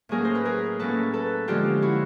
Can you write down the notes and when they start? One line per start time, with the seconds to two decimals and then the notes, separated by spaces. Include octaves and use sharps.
0.09 A2 F#3 A#3 C#4 G#4 A#4
0.25 C5
0.35 B4
0.45 G#4 A#4
0.79 A2 F#3 A#3 C#4 A4 B4
1.14 A4 B4
1.48 D3 F3 G#3 C#4 F4 G4
1.82 E4 F#4